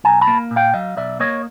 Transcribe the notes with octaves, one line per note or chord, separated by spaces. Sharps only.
B1 G#5 A#5
A5 B5
A#3
A#2
F5 G5
F#3 D#5 F5
B1 D5 E5
A#3 C#5 D#5